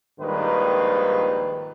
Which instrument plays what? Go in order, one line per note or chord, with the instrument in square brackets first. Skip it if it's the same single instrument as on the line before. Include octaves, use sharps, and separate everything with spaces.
[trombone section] A#1 G#2 D#3 G3 D#4 B4